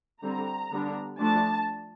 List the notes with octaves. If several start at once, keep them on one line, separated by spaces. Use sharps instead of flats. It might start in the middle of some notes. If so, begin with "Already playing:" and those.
D3 G3 C4 A#5
D3 G3 B3 D4
F3 A3 D4 A5